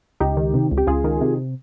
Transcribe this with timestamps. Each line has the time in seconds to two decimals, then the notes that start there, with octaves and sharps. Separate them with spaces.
0.20 C#2 D#4 G4
0.37 D#3
0.54 C3
0.71 C#2
0.78 G4
0.87 C#2 F4 G#4
1.04 D#3
1.21 C3